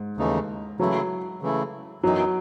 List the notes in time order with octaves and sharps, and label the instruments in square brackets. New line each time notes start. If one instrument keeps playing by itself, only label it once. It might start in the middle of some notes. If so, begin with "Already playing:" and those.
Already playing: [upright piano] G#2
[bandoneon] D#2 C#3 E3 A3 D#4
[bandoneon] C#3 E3 A3 E4 [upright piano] F#3
[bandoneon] C#3 E3 A3 E4
[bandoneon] F#2 E3 B3 D#4 [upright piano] F#3